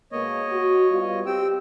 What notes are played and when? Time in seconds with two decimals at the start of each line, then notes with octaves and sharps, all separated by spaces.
0.12 B2 G#3 A#3 C#5 D#5
0.50 F#4
0.90 G3 B3 F4
1.26 C4 G4 G5 E6